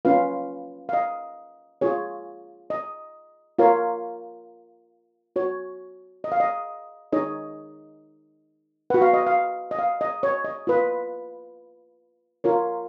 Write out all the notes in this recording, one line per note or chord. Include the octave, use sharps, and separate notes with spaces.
C#4 F4 B4 F5
F5
D#5
F4 G#4 C#5
D#5
F4 A#4 C#5 F5
F#4 C#5
D#5
F5
D#5
D#4 G#4 C#5 D#5
F#4 B4 F#5
F5
D#5
F5
D#5
F5
D#5
C#5
D#5
F4 B4
F4 A#4 C#5